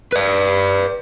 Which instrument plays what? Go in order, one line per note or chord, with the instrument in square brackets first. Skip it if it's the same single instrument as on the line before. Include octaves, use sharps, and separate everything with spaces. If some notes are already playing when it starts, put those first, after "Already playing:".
[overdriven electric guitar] B4 D5